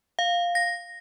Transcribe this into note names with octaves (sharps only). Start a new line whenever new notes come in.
F5
A#6